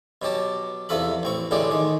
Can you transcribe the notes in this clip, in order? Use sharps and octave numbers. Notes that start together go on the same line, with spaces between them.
B2 F#3 G4 A5
E2 C3 F3 A4 B5
A1 C4 C#6
C#2 A2 D3 G#3 G4 D5
D#3 G#3